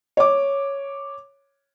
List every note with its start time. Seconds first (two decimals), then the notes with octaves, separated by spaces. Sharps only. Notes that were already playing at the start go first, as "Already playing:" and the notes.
0.17 C#5 D6